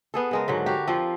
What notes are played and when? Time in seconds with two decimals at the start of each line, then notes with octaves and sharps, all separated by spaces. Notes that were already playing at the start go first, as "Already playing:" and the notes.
0.14 B3 G#4 A4
0.31 C#3 G#3 A#4
0.48 G#2 D3 F#3
0.66 F#4 G4 F5
0.88 F3 C4 F4